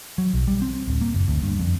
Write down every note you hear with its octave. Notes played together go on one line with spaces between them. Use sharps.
F#3
B1
G3
C4
D1
A#3
F#1
D2
G2
F2